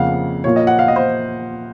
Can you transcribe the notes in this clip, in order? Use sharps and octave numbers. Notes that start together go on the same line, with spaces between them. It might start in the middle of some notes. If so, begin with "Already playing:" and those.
Already playing: F2 C#3 F3 A#3 F5 F#5
A#2 F3 A#3 C#5
D#5
F#5
F5
D#5
C5